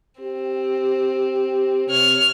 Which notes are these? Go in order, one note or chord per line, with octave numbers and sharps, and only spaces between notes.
C4 G4
C3 C#5 F6